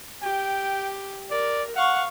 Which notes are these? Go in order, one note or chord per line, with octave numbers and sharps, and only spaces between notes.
G4 G5
A#4 D5
F5 F#5 C#6